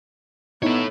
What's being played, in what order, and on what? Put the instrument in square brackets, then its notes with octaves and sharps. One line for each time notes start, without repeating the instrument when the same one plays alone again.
[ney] B3 [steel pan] D#4 E4 [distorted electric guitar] A4 C#5